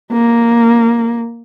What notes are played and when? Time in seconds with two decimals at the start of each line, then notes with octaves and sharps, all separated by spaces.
0.12 A#3